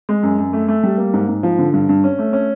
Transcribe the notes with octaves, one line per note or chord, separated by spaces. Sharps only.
G#3
F#2
F#2
A3
A3
G3
A#3
G#2
G#2
F3
D3
G2
G2
C#4
A3
C#4